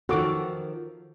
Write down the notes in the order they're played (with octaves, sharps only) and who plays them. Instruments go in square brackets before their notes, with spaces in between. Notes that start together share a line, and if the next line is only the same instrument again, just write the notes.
[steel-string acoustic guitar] D#3 F3 [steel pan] F#4 A4 D6